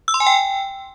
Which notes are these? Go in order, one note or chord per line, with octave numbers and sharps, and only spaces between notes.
E6
C6
G#5
G5